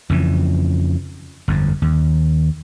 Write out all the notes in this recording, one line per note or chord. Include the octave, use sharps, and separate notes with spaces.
F2 C#3 E3
G1 F2
D#2